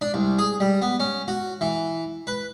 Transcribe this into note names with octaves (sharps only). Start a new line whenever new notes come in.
D4
C2
G#4
G3
B3
C#4
F#4
E3
B4